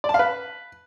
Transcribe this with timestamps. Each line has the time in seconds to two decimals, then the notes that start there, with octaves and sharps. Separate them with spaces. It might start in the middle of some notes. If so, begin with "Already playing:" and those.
0.04 D5
0.09 A5
0.14 F5
0.19 B4